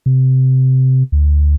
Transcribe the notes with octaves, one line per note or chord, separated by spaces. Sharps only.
C3
D2